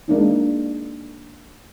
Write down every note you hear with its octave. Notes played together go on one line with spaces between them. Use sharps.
G#3 A#3 D4 D#4